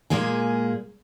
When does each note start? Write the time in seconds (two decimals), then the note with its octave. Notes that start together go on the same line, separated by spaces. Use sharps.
0.10 A#2 G#3 A#3 G#4